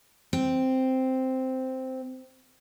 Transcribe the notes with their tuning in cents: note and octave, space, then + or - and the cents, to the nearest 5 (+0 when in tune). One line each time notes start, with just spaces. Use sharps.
C4 -5